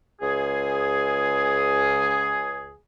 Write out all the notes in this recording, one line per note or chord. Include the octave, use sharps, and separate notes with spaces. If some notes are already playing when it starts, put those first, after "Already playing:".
C#2 G#4